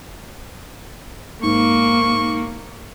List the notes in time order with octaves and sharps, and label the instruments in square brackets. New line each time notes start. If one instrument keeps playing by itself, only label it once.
[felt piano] G#2 [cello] A#3 [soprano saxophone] C#6